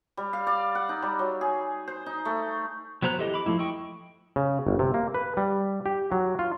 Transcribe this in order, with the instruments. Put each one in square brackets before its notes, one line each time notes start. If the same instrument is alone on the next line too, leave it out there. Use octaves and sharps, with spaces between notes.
[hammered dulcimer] G3
F5
D5
F#5
D#4
G3
F#3
G#4
C5
D#4
A3
[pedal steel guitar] F#3 B3 C5 A#5 F#6
E3 G4 A4 D#5
B5 D6
F3 G#3 A3 E4
D#5 G5 C#6
[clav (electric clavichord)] C#3
G1
C3
A#3
B4
G3
G4
F#3
F4